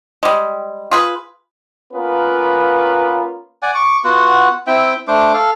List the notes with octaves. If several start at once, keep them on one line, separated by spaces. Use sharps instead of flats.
G3 G#3
F4 G#4 B4
A#3 B3 C#4 F4 A#4 B4
D5 F#5 G#5
C#6 D6
B3 F4 F#4 F#5
C4 E4 E5 G5
A3 D4 C5 D6
A4 F5